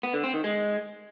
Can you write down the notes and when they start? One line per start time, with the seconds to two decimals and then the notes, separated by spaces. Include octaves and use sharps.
0.03 B3
0.14 D3
0.24 C4
0.34 D#3
0.44 G#3